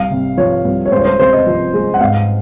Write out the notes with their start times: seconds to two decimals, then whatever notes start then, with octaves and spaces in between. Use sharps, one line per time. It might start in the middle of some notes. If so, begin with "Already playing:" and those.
Already playing: C2 F5
0.10 C3
0.37 F3 C#5
0.65 C2
0.86 C#5
0.92 C#2 C5
0.99 C#5
1.05 C5
1.19 C3 C5
1.33 D#5
1.46 F3
1.74 G#3
1.94 F#5
2.01 G#2 F5